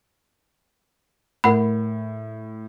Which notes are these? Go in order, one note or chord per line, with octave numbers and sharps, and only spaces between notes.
A2 A#4 F#5 B5